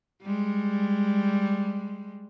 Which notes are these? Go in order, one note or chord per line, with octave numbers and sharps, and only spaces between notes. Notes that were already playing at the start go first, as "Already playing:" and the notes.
G3 G#3